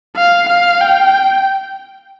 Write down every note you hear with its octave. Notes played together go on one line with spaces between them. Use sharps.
F5
F5
G5